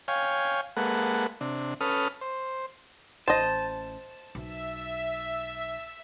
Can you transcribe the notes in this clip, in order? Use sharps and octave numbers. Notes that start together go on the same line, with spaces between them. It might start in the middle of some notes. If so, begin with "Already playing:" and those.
C#5 F5 G5 G#5
G#3 A#3 A4 B4 F#5
C3 D4
C#4 A4 B4 D#6 F6
C5
A1 C5 D#5 A5
B1 E5